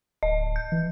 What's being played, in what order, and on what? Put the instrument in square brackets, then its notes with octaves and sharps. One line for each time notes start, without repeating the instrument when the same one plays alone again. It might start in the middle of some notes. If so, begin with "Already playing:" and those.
[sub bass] D1 [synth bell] D#5
[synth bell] G6
[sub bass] E3